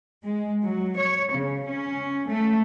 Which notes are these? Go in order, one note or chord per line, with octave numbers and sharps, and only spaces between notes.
G#3
F#3
C#5
C#3
C#4
A3